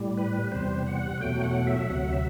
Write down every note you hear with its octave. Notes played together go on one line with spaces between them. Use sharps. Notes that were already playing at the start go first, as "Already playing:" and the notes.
Already playing: A2 G3
B4
E2 C3 G3 C5
F#5
E2 B2 F#3 A3 G5
F#5
E5
D2 C3 F#3 F#5
E5